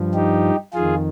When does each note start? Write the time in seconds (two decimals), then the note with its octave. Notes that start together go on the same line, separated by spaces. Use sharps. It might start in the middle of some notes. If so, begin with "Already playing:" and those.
Already playing: G2 F3
0.14 D#4 G4
0.74 F2 D#3 F4 G#4